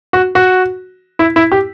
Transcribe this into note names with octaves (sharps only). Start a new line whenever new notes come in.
F#4
F#4
E4
E4
G4